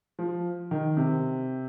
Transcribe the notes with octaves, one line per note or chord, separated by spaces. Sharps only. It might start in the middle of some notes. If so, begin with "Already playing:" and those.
F3
D#3
C3